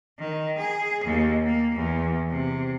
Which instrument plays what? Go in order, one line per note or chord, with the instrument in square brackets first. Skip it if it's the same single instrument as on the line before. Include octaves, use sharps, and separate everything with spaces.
[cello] D#3
G#4
D#2
A#3
E2
C3